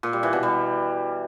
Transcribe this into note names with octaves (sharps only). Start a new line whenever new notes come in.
A#2
G3
E3
B2
G3